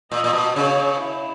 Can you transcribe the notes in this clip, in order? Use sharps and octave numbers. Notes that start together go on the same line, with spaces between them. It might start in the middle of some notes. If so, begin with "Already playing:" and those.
A#2 D#5
A#2
B2
C#3 C#5
E4